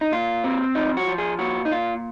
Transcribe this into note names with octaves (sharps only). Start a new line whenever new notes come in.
D#4
A#2 F4
C4
F3 D#4
F#4
F3
G#4
A#2 F#4
D#4
A#2 F4